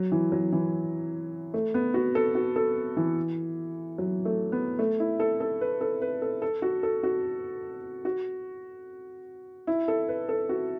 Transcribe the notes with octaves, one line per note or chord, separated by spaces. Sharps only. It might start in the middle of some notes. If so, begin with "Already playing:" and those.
Already playing: F#3
E3
F#3
E3
A3
B3
F#4
A4
F#4
A4
E3
F#3
A3
B3
A3
E4
A4
A4
B4
A4
B4
A4
A4
F#4
A4
F#4
F#4
E4
A4
B4
A4
F#4